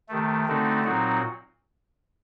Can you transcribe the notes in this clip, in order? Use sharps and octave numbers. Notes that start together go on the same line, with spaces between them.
C3 D#3 A3
D3 A3 C4 D#4 F#4
A#2 F#3 C4 D#4 F#4